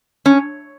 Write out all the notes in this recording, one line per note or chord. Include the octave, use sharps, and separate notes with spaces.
C#4